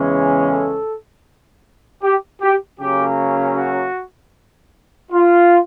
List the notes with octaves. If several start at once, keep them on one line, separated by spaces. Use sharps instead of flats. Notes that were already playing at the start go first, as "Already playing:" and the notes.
Already playing: E2 C#3 E3 G#3 C#4
A4
G4
G4
C#3 F#3 A#3 C#4 G4
F#4
F4